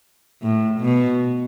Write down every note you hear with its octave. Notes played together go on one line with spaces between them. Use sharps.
A2
B2